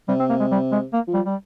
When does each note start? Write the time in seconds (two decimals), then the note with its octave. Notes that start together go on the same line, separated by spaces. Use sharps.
0.08 C3 G3
0.20 C4
0.30 A#3
0.40 G#3
0.51 G3
0.72 G#3
0.93 A#3
1.07 F3
1.14 G3
1.26 G3